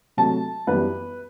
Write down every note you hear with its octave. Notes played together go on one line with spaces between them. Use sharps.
C3 F#3 A3 A5
F#2 E3 G3 B3 B4